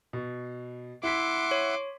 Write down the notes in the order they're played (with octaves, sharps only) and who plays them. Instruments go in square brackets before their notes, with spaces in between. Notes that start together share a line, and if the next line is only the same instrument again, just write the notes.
[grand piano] B2
[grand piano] E4 B6 [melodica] E5 F#5 [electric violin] C6 D6
[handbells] C#5